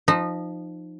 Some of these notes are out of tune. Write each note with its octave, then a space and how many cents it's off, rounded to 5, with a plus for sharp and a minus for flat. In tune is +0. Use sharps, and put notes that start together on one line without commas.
F3 +0 D#4 -20